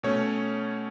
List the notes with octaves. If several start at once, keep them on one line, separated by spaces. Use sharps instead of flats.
B2 A3 C#4 C#5